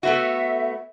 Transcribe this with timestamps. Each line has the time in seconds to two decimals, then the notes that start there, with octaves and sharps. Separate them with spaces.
0.03 A3 B3 F#4 E5